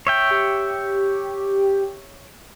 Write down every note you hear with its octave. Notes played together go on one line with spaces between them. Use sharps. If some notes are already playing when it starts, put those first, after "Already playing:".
C#5 E5 G5
G4